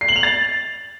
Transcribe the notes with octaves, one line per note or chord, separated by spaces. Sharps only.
C7
F#7
F7
A6